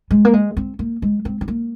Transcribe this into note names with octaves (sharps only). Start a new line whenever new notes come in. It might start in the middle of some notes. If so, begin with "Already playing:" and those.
G#3
A#3
G#3
C4
A#3
G#3
C4
C4
A#3